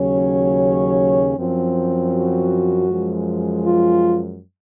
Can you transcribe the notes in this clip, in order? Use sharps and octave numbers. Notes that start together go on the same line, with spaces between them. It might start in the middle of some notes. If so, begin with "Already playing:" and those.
Already playing: D#2 C#3 F#3 C#4 C#5
F#2 F3 C4
F#4
F#2 F3 G#3
F4